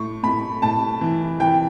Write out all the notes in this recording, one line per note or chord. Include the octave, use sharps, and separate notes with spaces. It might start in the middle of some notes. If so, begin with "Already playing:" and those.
Already playing: A2 C#6
A2 B5
A2 A5
E3
E3 G5